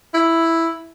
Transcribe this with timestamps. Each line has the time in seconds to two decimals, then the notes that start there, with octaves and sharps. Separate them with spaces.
0.14 E4